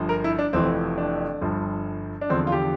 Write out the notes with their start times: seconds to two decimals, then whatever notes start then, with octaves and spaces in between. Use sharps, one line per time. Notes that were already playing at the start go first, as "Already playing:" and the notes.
Already playing: G1 G2 F3
0.09 A#4
0.24 E4
0.39 D4
0.53 F1 F2 E3 C4
0.98 D4
1.41 G1 G2 F3
2.21 D4
2.30 E2 D3 F3 C4
2.47 F4
2.52 G4